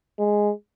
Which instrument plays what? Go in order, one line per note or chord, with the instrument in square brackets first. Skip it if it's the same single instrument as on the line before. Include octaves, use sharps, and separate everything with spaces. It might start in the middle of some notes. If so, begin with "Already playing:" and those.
[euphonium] G#3